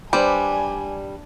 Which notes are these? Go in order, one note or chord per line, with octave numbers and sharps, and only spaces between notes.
G3 D4 B4 C5 G#5